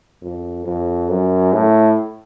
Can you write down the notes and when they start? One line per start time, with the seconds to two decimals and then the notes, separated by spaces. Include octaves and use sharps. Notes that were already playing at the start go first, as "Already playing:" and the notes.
0.22 F2
0.65 F2
1.09 F#2
1.53 A2